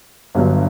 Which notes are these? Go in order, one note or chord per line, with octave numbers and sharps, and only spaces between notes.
G1 G2 D3 F#3